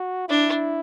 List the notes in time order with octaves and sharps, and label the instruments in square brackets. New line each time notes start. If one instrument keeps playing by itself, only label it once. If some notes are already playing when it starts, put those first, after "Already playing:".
Already playing: [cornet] F#4
[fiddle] D4 [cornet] E4